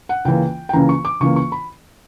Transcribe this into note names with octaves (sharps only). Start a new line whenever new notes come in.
F#5
C#2 C#3 E3 A#3 G5
G5
C#2 C#3 E3 A#3 A#5
C#6
D6
C#2 C#3 E3 A#3 C#6
C#6
B5